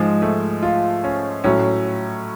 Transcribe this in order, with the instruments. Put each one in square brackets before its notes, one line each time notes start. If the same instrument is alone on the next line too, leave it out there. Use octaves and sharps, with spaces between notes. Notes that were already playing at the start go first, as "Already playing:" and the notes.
Already playing: [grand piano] G#2 F3 G#3
A3
F4
C#4
A2 F#3 C#4